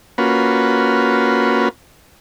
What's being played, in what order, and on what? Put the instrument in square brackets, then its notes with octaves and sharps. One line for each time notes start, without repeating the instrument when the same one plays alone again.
[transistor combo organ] A#3 C#4 F4 F#4 B4